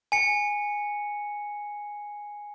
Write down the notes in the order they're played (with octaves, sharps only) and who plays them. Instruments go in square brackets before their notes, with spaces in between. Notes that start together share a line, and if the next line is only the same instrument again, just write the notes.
[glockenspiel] G#5 C#7